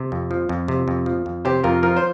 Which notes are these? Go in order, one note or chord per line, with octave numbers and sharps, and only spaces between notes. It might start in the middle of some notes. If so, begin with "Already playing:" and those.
Already playing: C3
F2
F3
F2
C3
F2
F3
F2
C3 G4 C5
F2 F4 A#4
F3 F4 A#4
C5